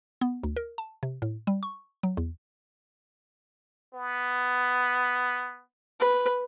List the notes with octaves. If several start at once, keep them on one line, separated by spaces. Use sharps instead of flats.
B3
D2
A#4
A5
C3
A2
G3
C#6
F#3
E2
B3
B4